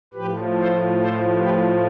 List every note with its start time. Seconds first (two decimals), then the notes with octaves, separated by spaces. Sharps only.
0.14 A2 F3 G4 B4
0.55 A4 C5
0.97 A4 C5
1.37 G4 B4